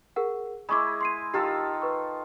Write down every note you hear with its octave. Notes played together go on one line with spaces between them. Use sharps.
G#4 A#4 F#5
G#3 E4 B5 C#6 D6
C6 C7 D#7
D#3 F4 G4 A4
B4 C#6